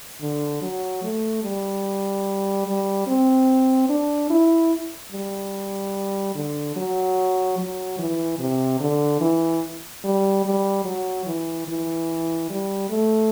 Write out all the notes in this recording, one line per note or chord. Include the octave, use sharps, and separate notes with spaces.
D3
F#3
A3
G3
G3
C4
D4
E4
G3
D3
F#3
F#3
E3
C3
D3
E3
G3
G3
F#3
E3
E3
G3
A3